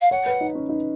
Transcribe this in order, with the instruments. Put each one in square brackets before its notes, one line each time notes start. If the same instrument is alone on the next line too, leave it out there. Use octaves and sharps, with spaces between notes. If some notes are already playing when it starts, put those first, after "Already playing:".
[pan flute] F5
[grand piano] C#5 [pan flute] F#5
[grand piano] B4
D#4
C#4
D#4